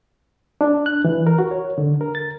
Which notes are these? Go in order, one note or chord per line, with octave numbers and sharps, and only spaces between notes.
D4
F#6
E3
A#4
F#4
C#5
D3
A#4
A6